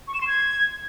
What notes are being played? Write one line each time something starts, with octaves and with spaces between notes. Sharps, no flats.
C#6
E7
C6
G#6